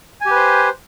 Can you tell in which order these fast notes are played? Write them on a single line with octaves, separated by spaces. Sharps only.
G#5 G4 B4 C5